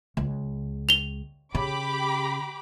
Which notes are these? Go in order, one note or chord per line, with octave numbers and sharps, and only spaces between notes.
C#2
F7 G7
C#3 G4 B5 D6